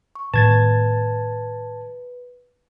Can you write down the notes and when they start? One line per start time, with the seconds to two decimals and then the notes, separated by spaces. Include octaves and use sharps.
0.15 C#6
0.34 A2 D#3 B3 B4 A5 G#6 A6